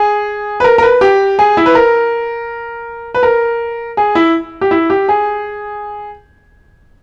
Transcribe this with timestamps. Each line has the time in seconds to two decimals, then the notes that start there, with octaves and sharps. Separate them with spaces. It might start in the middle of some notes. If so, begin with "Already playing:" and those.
Already playing: G#4
0.60 B4
0.64 A#4
0.78 A#4
0.83 B4
1.01 G4
1.39 G#4
1.57 E4
1.66 B4
1.75 A#4
3.14 B4
3.23 A#4
3.97 G#4
4.15 E4
4.61 G4
4.71 E4
4.90 G4
5.09 G#4